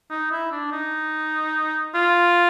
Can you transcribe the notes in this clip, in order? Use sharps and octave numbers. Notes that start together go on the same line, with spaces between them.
D#4
E4
D4
D#4
F4